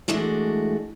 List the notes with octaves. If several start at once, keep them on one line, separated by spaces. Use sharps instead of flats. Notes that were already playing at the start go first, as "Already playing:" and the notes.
E3 G#3 A3 D4 F#4